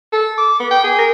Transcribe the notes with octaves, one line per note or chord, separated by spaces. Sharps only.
A4
D6
B3
G5
G#4
A#4